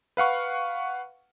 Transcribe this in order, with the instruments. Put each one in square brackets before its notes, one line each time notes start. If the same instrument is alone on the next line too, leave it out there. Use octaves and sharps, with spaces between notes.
[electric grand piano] B4 F5 F#5 C#6